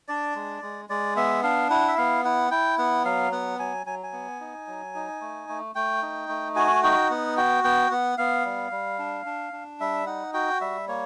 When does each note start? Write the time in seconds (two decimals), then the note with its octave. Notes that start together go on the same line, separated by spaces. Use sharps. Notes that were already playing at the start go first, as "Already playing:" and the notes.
0.08 D4 D5
0.35 G#3
0.62 G#3
0.89 G#3 D5
1.16 B3 E5
1.43 D4 F5
1.70 E4 F#5
1.88 E5
1.97 B3 F5
2.25 E4 F#5
2.51 E4 G5
2.78 B3 F#5
3.05 F#3 F5
3.32 B3 F#5
3.59 F#3 G#5
3.86 F#3 G#5
4.03 G#5
4.13 B3
4.40 D#4
4.67 F#3
4.95 D#4
5.21 A3
5.49 A3
5.75 A3 G5
6.02 D#4
6.29 A3
6.56 F#4 G#5
6.83 D#4 G5
7.10 B3 F#5
7.37 F#4 G5
7.64 B3 G5
7.91 B3 F#5
8.18 B3 F5
8.45 G3
8.71 G3
8.99 D4
9.26 D4
9.53 D4
9.80 G3 E5
10.06 D#4 F#5
10.34 F#4 G5
10.61 G3 E5
10.88 A#3 C#5